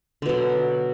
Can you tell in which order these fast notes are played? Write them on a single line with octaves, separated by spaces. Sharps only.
D3 B2 F#3